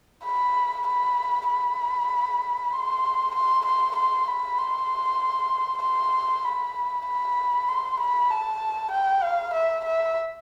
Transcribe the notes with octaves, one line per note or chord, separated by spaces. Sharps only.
B5
B5
B5
C6
C6
C6
C6
B5
C6
C6
B5
B5
C6
B5
A5
G5
F5
E5
E5